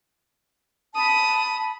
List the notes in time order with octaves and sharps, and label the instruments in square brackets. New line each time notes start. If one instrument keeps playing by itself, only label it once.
[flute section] A5 B5 [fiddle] D#6